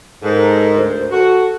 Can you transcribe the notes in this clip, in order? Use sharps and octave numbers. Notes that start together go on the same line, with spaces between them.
G#2 A4 A#4
D2 A#4 C5
F#4 A4